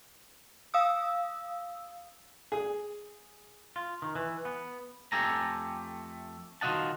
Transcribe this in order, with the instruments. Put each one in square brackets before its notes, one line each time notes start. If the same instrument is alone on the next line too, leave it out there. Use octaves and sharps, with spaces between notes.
[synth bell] F5 D#6 E6
[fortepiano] G#4
[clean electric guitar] F4
D#3
E3
B3
F2 A3 G4 A4 G#5 A#5
D#3 F4 F#4 D#5 F#5 A5